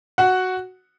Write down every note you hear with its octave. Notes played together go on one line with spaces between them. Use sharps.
F#4 F#5